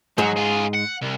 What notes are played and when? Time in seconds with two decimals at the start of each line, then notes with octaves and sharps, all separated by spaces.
0.18 G#2 F#3 G#3
0.37 F4 G#4
0.74 F#5
1.02 C2